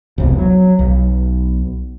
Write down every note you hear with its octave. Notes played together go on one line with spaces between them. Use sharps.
E1 C2
F#3
B1